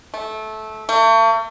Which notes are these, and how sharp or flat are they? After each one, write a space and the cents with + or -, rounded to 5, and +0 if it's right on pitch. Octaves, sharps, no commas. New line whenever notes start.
A3 -15
A3 +40